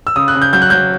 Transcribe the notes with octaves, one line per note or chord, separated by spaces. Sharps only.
E6
C#3 D#6
F#6
C#3
G6
F#3 G6
F#6
F#3 G6